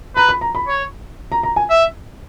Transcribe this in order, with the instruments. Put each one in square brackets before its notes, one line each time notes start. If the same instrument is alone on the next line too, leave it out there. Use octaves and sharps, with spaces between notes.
[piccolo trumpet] B4 [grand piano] A#5
[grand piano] B5
A#5
B5
[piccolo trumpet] C#5
[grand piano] A#5
A#5
G#5
[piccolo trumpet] E5